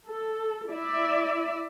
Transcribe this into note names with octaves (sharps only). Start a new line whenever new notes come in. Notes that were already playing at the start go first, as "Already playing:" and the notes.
A4
E4 D5 E5